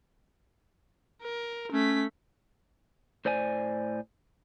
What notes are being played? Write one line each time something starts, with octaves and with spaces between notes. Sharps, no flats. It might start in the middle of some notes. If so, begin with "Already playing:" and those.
A#4
A3 C#4 B6
A2 C5 D5 G#5